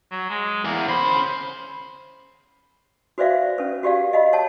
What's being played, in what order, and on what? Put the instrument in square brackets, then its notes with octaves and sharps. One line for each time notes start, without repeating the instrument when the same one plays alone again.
[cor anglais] F#3
G#3
[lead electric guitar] E2 [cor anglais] A#3
[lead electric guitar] C#3 B5 [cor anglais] C5
[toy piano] F#4 B4 C5 D5 E5 F5
C#4 B4
F#4 G4 D5 F5
D#5 F5 F#5 B5
C#5 F#5 A5